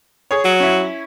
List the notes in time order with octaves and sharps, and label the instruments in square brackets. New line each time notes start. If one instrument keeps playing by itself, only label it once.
[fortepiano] G#4 C#5
[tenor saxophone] F#3
[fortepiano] C#4 E4